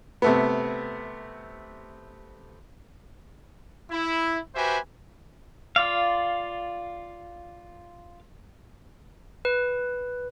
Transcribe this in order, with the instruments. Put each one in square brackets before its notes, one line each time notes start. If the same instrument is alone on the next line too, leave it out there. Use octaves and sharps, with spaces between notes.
[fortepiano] C3 A3 B3
[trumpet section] E4
F#4 G4 B4 C5 E5 G#5
[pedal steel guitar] F4 D5 F5
[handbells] B4